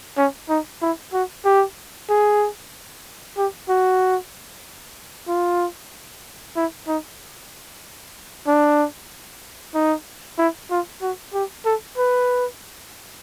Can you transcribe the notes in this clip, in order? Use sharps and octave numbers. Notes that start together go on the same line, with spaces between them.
C#4
D#4
E4
F#4
G4
G#4
G4
F#4
F4
E4
D#4
D4
D#4
E4
F4
F#4
G4
A4
B4